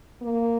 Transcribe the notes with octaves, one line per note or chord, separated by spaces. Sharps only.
A#3